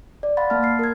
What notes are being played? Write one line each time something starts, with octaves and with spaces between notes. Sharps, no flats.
D5
F5 F#5 B5 C6 A6
A#3 A5 F6
F6 C7
A#4 G#6